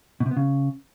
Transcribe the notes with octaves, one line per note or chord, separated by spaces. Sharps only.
B2
C3
B3
C#3